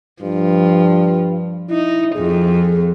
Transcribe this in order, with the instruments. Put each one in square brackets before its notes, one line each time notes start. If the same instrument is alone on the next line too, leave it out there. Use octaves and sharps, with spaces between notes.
[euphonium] G2 [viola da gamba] F3
[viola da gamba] D#4 [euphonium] E4
[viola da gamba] F2 [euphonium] G#4